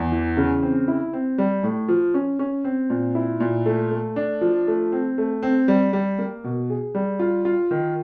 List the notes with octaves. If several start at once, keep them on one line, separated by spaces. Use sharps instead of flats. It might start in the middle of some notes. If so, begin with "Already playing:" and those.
Already playing: E2
E3
C#3
C4
E4
C4
G3
A2
F3
C#4
C#4
C4
A#2
E4
A#2
A3
A3
D4
F3
A3
C4
A3
C4
G3
G3
A#3
B2
G#4
G3
F4
F4
D#3